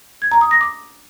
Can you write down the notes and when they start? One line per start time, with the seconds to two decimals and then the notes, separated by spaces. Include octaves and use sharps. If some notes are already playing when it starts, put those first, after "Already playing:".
0.22 G#6
0.32 A#5
0.41 D#6
0.51 A#6
0.61 D6